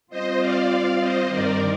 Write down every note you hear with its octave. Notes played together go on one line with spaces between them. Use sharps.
G3 C4 F4 C5 D#5
D5 F5
C5 D#5
G2 D#3 G3 C4 A#4 D5